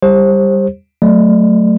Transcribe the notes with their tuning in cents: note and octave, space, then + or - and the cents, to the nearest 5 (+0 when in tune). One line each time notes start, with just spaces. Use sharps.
G3 +0 G4 +20 C5 +30
F#3 +0 A3 +0 D5 +25